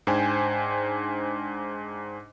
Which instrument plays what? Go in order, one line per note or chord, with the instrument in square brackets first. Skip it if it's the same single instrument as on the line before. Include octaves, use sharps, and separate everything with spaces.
[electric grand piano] G#2 D4 C5 G5 G#5